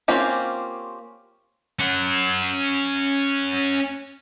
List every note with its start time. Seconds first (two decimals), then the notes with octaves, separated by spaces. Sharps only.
0.08 A#3 C4 C#4 F4 G4
1.79 C#4 F#5